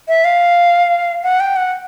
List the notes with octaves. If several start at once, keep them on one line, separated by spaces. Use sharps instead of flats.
E5
F5
F#5
G5
F#5